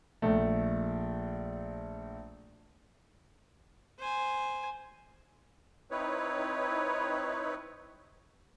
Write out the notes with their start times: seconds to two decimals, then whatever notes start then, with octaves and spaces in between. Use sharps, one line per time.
0.22 A#1 A3
3.99 C5 G#5
5.91 C4 D#4 E4 B4 C#5